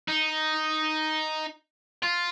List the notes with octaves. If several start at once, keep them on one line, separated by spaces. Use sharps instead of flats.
D#4
F4